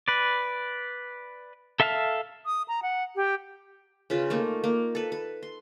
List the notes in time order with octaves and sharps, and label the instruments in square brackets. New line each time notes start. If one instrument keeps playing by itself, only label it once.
[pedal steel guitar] B4 D5
A4 E5 F5 A5 F6
[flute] D#6
A#5
F#5
G4
[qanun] C#3 F4 B4
A3 A#3 D#4
A#3
A4 B4
B4
C6